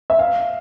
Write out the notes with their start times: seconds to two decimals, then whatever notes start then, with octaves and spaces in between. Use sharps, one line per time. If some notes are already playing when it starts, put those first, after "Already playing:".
0.10 E5
0.19 F5